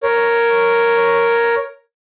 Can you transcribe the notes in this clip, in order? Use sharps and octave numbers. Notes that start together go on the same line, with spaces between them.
A#4 C#5